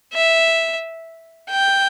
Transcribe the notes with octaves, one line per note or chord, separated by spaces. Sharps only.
E5
G5